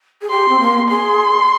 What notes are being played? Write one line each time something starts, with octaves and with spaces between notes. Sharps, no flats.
G#4
G4 C6
C4
A#3
G#4 C6